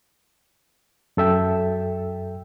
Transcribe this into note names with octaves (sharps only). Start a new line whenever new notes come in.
F#2 A4 E5 G5